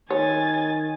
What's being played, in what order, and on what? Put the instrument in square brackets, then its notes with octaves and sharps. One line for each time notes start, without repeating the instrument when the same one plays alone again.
[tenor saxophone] D#3 [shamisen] C#5 [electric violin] G#5 A6